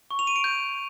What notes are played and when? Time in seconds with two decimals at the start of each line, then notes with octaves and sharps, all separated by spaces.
0.11 C#6
0.19 F7
0.27 D#7
0.36 D7
0.44 G6